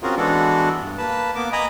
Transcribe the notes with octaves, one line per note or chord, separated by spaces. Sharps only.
C4 C#4 F4 F#4 G#4 A#4
E3 G#3 B3 D4 F#4 A4
G2
A#3 B4 A5
A#3 B3 D6
D#5 G#5 A#5 B5 D#6